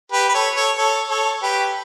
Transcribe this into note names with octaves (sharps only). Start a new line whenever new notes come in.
G4 B4
B4
A4 C#5
A4 C#5
A4 C#5
A4 C#5
G4 B4